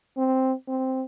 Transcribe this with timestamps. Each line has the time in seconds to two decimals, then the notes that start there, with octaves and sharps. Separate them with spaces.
0.17 C4
0.68 C4